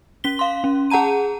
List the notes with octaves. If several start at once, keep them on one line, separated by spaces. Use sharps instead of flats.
C#4 B6 G7
F5 C6
C#4
G#4 F#5 A5 A#5 D#7